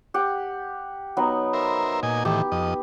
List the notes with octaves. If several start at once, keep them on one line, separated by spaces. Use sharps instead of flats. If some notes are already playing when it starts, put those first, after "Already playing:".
G4 F#5
F#3 B3 D#4
A#4 C5 E5
A#2 D#5 G#5
A2 D#3 E3 G4
F2 D#5